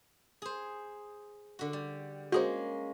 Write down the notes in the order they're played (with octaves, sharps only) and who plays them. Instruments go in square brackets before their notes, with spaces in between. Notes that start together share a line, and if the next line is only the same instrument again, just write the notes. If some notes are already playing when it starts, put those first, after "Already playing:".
[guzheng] G#4 C5
D3 F#4
G3
[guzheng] G#3 A#3 C#4 [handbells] F#4 G#4 C5